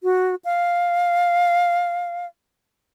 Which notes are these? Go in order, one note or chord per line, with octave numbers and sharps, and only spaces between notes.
F#4
F5